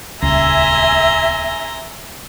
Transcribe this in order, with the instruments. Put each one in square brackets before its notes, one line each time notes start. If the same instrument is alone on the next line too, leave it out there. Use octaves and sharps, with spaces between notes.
[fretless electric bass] D#1 C#2 [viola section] E5 G#5 [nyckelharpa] A#5 C6